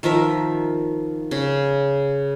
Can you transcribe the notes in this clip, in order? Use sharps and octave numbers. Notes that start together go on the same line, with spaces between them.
D#3 F3 A#4 E5
C#3